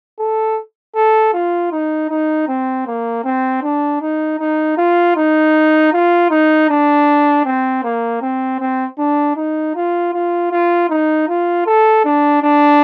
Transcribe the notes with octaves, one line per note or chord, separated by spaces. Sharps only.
A4
A4
F4
D#4
D#4
C4
A#3
C4
D4
D#4
D#4
F4
D#4
F4
D#4
D4
C4
A#3
C4
C4
D4
D#4
F4
F4
F4
D#4
F4
A4
D4
D4